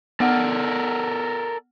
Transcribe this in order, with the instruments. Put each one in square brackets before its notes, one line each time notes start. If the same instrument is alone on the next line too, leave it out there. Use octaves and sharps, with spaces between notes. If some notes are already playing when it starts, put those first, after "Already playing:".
[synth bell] B3 F#5 F6 [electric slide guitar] A4 A#4 D5